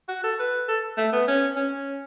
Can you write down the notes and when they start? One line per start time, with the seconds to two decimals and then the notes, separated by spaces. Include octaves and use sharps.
0.09 F#4
0.24 A4
0.39 B4
0.69 A4
0.98 A3
1.13 B3
1.28 C#4
1.56 C#4